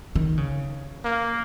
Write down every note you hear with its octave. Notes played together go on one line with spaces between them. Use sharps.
D#3
C#3
A#3